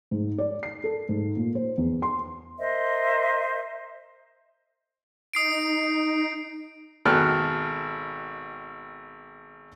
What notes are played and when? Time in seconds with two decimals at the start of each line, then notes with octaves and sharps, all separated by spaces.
0.11 G#2
0.38 D5
0.63 C7
0.84 A4
1.09 G#2
1.37 A#2
1.55 C5
1.78 E2
2.02 C6
2.58 A#4 C5 D#5 E5
5.33 D#4 D#6 C7 D7
7.05 G#1 B2 A4 G5 F6 F#6